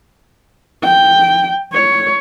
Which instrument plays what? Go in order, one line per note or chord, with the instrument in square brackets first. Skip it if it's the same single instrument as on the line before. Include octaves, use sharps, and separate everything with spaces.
[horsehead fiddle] G5
C#5